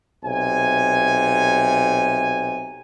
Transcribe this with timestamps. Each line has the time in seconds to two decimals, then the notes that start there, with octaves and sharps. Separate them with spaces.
0.24 B1 C3 G#5